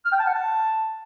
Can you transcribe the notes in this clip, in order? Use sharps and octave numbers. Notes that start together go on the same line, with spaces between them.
F6
G5
A5
F#5
A5